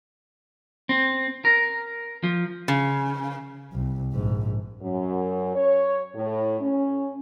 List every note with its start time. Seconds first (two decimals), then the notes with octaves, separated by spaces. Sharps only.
0.89 C4
1.45 A#4
2.23 F3
2.68 C#3
3.73 C2
4.13 A#1 G#2
4.81 F#2
5.55 C#5
6.14 A2
6.61 C#4